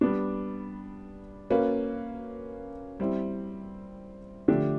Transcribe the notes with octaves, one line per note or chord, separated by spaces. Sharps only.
G3 B3 D4
A#3 C#4 F#4 B4
G3 C4 E4
D3 F3 A3 D4 G4